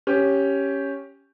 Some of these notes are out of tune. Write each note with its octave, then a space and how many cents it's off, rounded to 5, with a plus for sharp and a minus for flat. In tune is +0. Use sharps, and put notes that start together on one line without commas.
C#4 +0 G4 +0